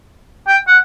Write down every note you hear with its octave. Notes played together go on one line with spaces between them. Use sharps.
G5
F#5